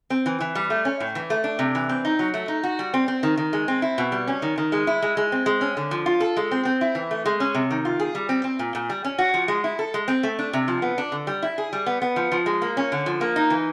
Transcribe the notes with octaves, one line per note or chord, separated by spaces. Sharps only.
C4
E3
E3
G3
A3
C#4
A2
E3
A3
D4
C3
E3
C4
D#4
F#3
A3
D#4
F#4
G3
C4
C4
D#3
D#3
G#3
C4
E4
B2
G3
C#4
D#3
D#3
G#3
E4
G#3
G#3
C4
G#3
C#4
D3
F3
F4
A4
G#3
C4
C4
E4
E3
A3
G#3
C#4
C3
D#3
F4
G#4
G3
C4
C4
A#2
A#2
G3
C#4
F#4
F3
G#3
E4
A4
G#3
C4
A3
D4
C3
F3
B3
D4
D3
G3
E4
G#4
G3
B3
B3
F3
F3
G#3
A#3
C#4
D3
F3
A#3
D#4
E3